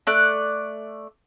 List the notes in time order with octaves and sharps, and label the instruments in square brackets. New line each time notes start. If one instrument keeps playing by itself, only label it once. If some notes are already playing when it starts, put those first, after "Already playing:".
[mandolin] A3 D5 F#6